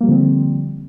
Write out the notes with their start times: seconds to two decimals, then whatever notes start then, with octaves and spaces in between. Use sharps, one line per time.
0.01 A#3
0.03 G3
0.06 F3
0.09 D3
0.11 C4